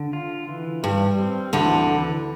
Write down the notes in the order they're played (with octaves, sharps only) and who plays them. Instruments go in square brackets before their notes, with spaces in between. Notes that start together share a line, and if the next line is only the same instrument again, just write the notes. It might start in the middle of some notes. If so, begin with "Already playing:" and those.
Already playing: [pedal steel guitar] D3
F4
E3
[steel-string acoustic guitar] G2 [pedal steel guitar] G3
[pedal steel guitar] C4
[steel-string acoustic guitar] D2 D3 [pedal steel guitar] E3
[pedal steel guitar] E3